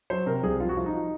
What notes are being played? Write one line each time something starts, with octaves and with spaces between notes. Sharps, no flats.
F#3 C5
C3 A#4
C2 G#4
F3 F4
F#4
F3 F4
D#4